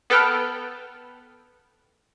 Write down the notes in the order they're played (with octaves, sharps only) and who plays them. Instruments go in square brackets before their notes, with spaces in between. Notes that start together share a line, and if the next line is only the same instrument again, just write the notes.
[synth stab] B3 A4 B4 G5 F6